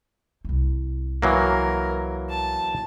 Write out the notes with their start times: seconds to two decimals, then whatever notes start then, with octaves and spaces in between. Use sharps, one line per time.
0.44 C2 E4
1.22 E3 F#3 A#3 A#4
2.30 A5